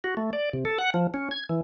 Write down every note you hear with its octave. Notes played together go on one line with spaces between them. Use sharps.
F#4
A3
D5
C3
A4
F#5
F3
C#4
G#6
E3